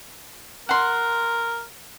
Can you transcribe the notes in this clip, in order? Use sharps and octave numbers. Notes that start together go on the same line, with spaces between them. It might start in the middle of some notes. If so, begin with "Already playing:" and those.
A#4 F#5 C6